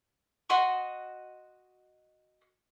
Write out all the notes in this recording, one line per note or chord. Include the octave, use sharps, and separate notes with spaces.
F#4 D#5 C6 C#6